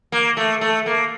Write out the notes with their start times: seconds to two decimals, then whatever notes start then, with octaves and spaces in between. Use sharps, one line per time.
0.12 A#3
0.37 A3
0.61 A3
0.86 A#3